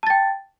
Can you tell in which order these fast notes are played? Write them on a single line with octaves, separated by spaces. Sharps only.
A5 A6 G5